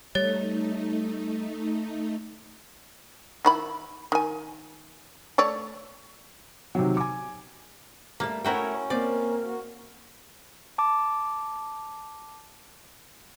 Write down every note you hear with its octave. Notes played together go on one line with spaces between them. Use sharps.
G3 A3 D#4 C#5 A6
D#3 E4 B5
D#3 G#5
A3 C#5 D5
C3 D#3 F#3
G#5 D6
G3 A3 A#3
A3 C#4 E4 F#4 A#4 C#5 G5
A#3 C4 D5
F#4
A5 D6